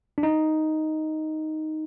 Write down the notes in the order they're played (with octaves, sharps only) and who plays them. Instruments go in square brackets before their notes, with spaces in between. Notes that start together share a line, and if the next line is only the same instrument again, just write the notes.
[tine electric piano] D4
D#4